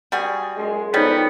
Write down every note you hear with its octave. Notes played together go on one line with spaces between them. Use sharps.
G3 F#4 G#4
F#2 A#2 G#3
G#1 F2 G3 B3 C4 D#4 A4 C#5